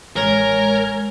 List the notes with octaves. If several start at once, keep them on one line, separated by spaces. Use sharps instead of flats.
A1 G#3 A#4 C#5